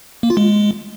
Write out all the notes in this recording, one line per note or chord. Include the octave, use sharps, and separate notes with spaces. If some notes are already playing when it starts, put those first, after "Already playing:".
A#3
F4
G#3